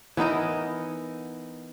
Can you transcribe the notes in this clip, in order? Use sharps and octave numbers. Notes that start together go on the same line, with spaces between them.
E3 B3 D#4 A#4